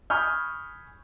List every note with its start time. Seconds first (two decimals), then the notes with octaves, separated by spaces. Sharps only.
0.10 G#5 B5 C#6 D#6 F6 G6